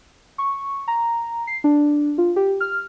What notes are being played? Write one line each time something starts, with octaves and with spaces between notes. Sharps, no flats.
C#6
A#5
C7
D4
F4
G4
F6